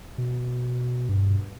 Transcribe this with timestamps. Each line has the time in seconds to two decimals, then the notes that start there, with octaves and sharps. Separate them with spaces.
0.18 B2
1.09 G2